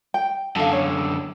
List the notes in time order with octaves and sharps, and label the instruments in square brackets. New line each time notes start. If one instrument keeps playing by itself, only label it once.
[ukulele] G5
[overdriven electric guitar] F#2 D3 [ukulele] A4 F5
[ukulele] C#5